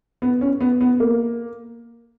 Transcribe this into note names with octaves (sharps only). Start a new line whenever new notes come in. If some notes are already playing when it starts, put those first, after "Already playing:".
B3
C#4
B3
B3
A#3